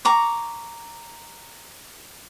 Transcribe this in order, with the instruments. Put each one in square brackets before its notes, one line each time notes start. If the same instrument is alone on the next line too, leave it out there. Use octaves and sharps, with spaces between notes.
[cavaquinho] A#5 C#6 D6